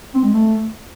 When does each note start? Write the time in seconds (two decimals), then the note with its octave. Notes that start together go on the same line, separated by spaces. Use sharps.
0.14 C4
0.24 G#3
0.33 A3